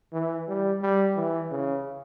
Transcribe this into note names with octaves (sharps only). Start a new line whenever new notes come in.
E3
G3
G3
E3
C#3